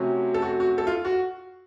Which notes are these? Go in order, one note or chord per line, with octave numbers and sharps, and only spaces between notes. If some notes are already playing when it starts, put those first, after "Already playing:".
Already playing: C3 F#3 A3 C#4
A4
F#4
F#4
A4
F4
F#4